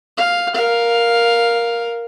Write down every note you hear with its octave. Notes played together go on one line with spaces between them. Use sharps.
F5
A#4 F5